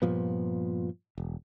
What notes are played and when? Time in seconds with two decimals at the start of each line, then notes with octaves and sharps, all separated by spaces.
0.02 G2 A#2 F3 B3
1.18 E1